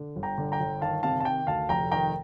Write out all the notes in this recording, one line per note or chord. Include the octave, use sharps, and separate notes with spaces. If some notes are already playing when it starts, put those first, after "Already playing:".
Already playing: D3
G1
G5 A#5
D3
G5 A#5
G1
D#3 F5 A5
C3 F5 A5
A5
D#3 G5
D2 F5 A5
F1 G5 A#5
D#3 G5 A#5